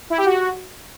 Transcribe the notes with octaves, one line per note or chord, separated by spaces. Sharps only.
E4
G4
F#4